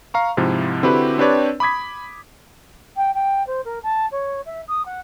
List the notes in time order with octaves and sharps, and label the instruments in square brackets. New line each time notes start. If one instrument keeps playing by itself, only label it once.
[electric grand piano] F5 A#5 C#6
G#2 C3 F3 E4 F4
D3 C4 E4 F#4 G4 B4
C4 D4 G4 B4 C#5 D5
B5 D6 D#6 G#6 B6
[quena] G5
G5
C5
A#4
A5
C#5
E5
D#6
F#5